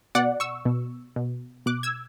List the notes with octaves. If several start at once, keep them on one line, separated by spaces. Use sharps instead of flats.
B2 D5 F#5
C#6 E6
B2
B2
B2 D6 F#6
E6 G#6